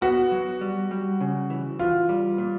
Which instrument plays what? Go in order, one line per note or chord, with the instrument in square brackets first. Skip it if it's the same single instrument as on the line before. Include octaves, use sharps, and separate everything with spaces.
[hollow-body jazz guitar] B3 [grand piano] F#4
[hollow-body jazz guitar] F#3
G3
G3
C#3
E3
[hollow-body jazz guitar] E3 [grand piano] F4
[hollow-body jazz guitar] G3
A#2